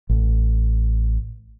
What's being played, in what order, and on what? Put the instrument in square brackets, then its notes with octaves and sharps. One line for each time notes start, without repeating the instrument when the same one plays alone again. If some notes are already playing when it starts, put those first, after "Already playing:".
[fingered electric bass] A1